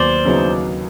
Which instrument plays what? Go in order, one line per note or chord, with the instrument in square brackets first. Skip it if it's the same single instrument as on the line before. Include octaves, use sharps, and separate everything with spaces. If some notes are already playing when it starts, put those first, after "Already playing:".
Already playing: [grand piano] D#2 F#3 B3 [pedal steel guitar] C5 D5
[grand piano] C#3 F#3 B3 D#4